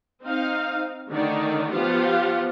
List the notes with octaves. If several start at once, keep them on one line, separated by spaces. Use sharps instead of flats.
C4 D#4 F5
D3 D#3 A3 D#4 C#5 D5
F3 B3 F4 G4 F5 F#5